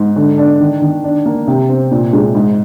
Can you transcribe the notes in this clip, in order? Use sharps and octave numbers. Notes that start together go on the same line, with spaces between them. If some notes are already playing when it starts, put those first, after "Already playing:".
Already playing: G#2
D3
D4
D#3
D#3
D4
A#3
C3
C4
A#2
G#3
G#2